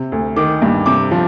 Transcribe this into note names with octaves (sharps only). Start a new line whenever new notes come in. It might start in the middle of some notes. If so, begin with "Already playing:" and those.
Already playing: C3
D2
D#3 D6
G2
C3 D6
F3